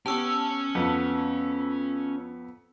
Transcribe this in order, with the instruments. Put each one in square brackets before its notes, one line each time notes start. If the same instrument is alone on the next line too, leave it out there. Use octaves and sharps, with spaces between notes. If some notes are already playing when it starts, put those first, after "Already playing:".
[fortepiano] B3 G4 [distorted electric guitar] C#4 C#5 [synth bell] A5 E6
[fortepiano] F2 [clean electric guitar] B3